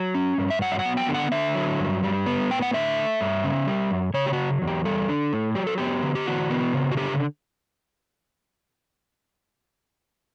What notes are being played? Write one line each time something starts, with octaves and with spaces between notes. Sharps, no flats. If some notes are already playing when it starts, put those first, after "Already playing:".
Already playing: F#3
C#4
G2
E5
F#3 F#5
E5
F#5
B3
G5
D3
F#5
D3 E5
F#3
G2
G3
B3
A2 G5
F#5
D3 E5
A3
G2
C#3
G3
F#2
C#3 C#5
G4
F#3 F#4
E2
G4
G3 A4
D4
A2
F#3 G4
A4
B3 G4
D3
G4
E3 F#4
B3
C#3
F#4
D3 G4